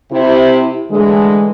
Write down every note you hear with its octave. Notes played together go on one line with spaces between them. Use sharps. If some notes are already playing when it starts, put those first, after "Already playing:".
C3 E4
A2 D3 E3 G#3